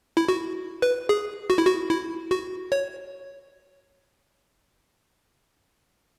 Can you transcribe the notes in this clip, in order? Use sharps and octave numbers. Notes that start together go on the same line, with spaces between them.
E4
F#4
B4
G#4
F#4
E4
F#4
E4
F#4
C#5